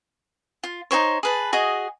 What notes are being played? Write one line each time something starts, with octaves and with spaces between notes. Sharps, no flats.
F4
D#4 G4 C5 C#5
G#4 B4 A5
F#4 G#4 D#5